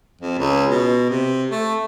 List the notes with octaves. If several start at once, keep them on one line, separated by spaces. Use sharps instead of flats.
F2
C#2
B2
C3
A3